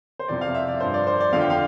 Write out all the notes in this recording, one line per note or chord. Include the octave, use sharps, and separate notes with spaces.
C5
F2 C3 E3 D5
F5
E5
D5
G2 F3 C5
D5
C5
D5
F2 D3 F3 F5
G5
F5